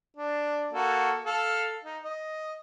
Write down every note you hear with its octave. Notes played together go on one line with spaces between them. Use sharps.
D4
A#3 F#4 A4
A4 F5
D#4
D#5